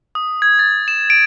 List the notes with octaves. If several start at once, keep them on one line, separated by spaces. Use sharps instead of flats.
D#6
G#6
A6
E7
D7